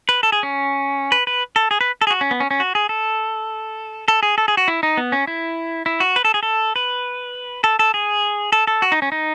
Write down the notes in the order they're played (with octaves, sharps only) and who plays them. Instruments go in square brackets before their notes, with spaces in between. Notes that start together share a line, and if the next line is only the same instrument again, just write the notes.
[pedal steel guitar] B4
A4
G#4
C#4
B4
B4
A4
G#4
B4
A4
G#4
F#4
C#4
B3
C#4
C#4
F#4
G#4
A4
A4
G#4
A4
G#4
F#4
E4
D#4
B3
C#4
E4
E4
F#4
B4
A4
G#4
A4
B4
A4
A4
G#4
A4
A4
F#4
D#4
C#4
D#4